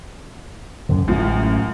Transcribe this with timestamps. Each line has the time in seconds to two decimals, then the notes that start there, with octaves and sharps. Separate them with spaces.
0.89 F#2 D3
1.08 A1 F#2 A2 F3 G#3